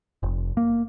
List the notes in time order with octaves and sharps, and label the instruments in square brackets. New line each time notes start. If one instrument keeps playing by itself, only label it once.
[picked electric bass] F1
A#3